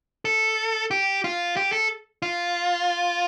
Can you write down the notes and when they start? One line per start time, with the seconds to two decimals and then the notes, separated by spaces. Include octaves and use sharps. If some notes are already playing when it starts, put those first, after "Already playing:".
0.25 A4
0.91 G4
1.24 F4
1.57 G4
1.72 A4
2.22 F4